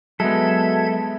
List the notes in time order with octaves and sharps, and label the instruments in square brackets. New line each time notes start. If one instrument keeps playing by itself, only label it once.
[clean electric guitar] F#3 [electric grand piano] G#3 B3 [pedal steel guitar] A4 [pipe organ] E5 G#6